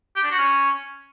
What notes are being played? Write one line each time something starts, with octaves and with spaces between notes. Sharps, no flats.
G4
D4
F#4
C#4